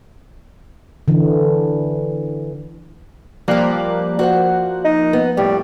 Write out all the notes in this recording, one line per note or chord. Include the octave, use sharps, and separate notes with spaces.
D3 E3
F3 G3 A#3 G4 F5 F#6
F#4 C5 F#5
D#4
B3
A2 G3